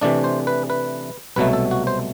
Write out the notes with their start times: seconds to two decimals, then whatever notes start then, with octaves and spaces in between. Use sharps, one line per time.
0.01 C3 E3 A3 D4 D5
0.24 C5
0.47 B4
0.70 B4
1.36 C2 B2 F#3 A3 B4
1.53 A4
1.71 F#4
1.87 C5